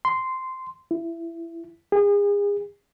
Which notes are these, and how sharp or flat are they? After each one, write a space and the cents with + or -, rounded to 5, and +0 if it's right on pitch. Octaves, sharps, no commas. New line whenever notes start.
C6 -10
E4 +20
G#4 -35